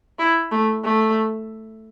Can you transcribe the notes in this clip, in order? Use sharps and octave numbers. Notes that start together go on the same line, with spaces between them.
E4
A3
A3